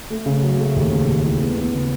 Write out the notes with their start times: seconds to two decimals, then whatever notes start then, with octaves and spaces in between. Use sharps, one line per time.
0.10 A3
0.26 C#3
0.43 F#3
0.59 A3
0.76 D#2
0.92 C#3
1.08 D#2
1.24 E3
1.40 B3
1.57 B3
1.73 C#3